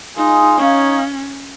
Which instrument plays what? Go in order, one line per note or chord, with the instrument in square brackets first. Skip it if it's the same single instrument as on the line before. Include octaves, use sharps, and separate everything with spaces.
[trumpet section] G#3 F4 G#4 [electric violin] D#4
[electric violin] C#4 [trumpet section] D#4 C#5 F5